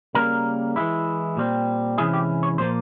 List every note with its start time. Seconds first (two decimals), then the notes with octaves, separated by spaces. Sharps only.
0.15 C#3 G3 A#3 A#4
0.76 E3 G#3 E4
1.37 A#2 G3 C4
1.98 C3 E3 G#3 C#4 E4 G#4
2.13 G4
2.43 C#5
2.58 A#2 F3 A#3 C5